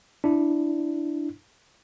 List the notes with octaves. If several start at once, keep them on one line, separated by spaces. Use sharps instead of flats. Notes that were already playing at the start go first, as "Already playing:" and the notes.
D4 E4